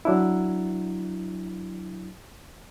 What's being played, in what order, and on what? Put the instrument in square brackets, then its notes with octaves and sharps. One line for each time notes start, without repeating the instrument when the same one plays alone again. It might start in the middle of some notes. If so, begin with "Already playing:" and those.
[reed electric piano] F#3 D4 E4